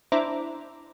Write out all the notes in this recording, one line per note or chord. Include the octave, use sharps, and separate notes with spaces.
D4 E4 C5 E5 A#5 D6